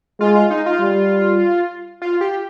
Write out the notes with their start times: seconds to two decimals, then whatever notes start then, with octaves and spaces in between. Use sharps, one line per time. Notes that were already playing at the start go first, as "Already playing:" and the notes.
0.20 G#3 F4
0.35 F4
0.50 D#4
0.66 F4
0.81 G3
2.02 F4
2.21 G4